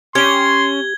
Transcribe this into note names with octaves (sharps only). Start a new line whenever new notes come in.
C#4 G4 C6 G#6 G7